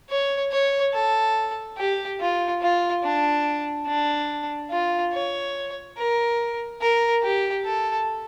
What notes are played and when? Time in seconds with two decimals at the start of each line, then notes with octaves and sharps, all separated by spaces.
0.10 C#5
0.52 C#5
0.94 A4
1.78 G4
2.21 F4
2.62 F4
3.03 D4
3.87 D4
4.71 F4
5.13 C#5
5.98 A#4
6.82 A#4
7.23 G4
7.66 A4